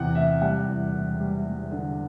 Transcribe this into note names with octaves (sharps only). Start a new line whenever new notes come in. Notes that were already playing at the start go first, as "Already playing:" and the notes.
Already playing: E2 C3 E3 F#5 G5
C3 E5
G3 F#5
E2
E1
G3
G3
D3